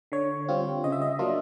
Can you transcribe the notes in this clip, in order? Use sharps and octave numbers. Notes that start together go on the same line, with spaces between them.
D3 C#5
G3 C4 F4
C#3 D#5
E5
D#5
F#3 A#3 D4 F4